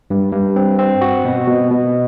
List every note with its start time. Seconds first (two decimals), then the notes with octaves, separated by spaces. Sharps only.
0.10 G2
0.32 G2
0.56 C4
0.79 C4
1.01 F#4
1.25 B2
1.47 B2
1.71 B2